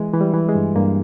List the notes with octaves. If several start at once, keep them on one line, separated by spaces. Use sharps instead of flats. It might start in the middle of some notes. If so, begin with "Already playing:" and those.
Already playing: E3 G#3
E3
G3
E3
G#3
G2
G2 A#3